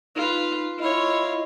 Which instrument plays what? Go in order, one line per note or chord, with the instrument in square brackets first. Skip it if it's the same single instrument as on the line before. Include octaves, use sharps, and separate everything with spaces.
[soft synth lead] D#4 [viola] F4 B4
[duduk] E4 [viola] F4 C#5 [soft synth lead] D#5